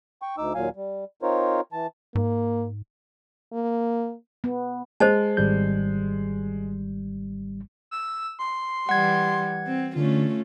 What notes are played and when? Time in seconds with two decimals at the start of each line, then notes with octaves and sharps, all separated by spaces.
0.22 G5 C#6
0.38 D2 D#4 D6 E6
0.55 D#2 A#2 F#3 F5 G#5
0.76 G3
1.22 C4 D#4 F4 A#4 C5 C#5
1.73 E3 A5
2.15 G#2 A#3
3.53 A#3
4.44 B3
5.00 G#3 C5 D#5 A5
5.37 G#1 G3 G6
7.91 E6
8.39 C6
8.89 E3 G3 F#5 G#6
9.67 C4
9.96 D3 A3 C#4 F4